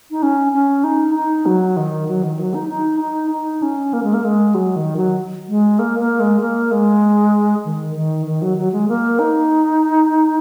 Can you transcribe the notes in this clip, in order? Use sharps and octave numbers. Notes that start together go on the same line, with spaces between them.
D#4
C#4
C#4
D#4
D#4
F#3
D#3
F#3
D#3
F#3
D#4
D#4
D#4
D#4
C#4
A#3
G#3
A#3
G#3
F#3
D#3
F#3
G#3
A#3
A#3
G#3
A#3
G#3
D#3
D#3
D#3
F#3
F#3
G#3
A#3
D#4